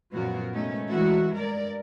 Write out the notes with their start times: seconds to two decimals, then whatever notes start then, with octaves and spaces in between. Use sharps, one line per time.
0.12 F#2 A#2 F3 B3 F#4 A#4
0.53 C3 G#3 A3 B3 C#4 D#4
0.87 E3 G#3 A3 F#4 E5
1.33 G2 A#4 D5